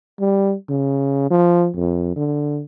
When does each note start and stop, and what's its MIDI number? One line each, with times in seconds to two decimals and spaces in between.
0.20 0.54 55
0.69 1.29 49
1.30 1.69 53
1.76 2.12 41
2.16 2.62 50